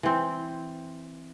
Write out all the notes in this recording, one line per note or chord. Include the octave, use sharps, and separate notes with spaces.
E3 C4